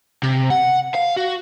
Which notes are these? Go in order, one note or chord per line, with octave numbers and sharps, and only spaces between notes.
C3
F#5
F5
F#4